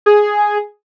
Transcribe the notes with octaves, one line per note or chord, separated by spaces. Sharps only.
G#4